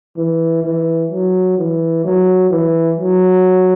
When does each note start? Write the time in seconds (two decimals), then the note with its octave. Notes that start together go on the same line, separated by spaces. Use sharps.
0.17 E3
0.63 E3
1.11 F#3
1.58 E3
2.05 F#3
2.50 E3
2.98 F#3